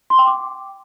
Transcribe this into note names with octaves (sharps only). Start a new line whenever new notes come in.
C6
G5
D6